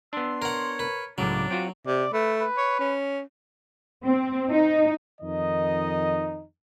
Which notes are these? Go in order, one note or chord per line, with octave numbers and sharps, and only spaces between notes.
B3 D4 C6 E6
A#4 C#5 F#5
A#4 B4
C#2 A2 C#3 F#3 D4 D6
C4 F4 F#4 D7
C3 D5
A3 B4
B4
C#5
C#4
C4
D#4
F2 D#3 D#4 D#5